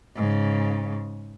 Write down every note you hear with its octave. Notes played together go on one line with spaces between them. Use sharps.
G#2 C#3